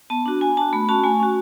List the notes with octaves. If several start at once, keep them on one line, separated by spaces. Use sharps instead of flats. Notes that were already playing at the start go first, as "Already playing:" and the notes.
B3 A5
D4 F#4
B3 G#5
D4 F#4 A5
A3 B5
C#4 F#4 A5
A3 G#5
C#4 F#4